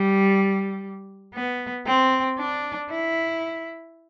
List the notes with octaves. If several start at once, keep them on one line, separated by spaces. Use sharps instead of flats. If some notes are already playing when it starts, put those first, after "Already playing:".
Already playing: G3
B3
C4
D4
E4